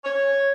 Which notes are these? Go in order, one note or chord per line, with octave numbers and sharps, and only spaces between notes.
C#5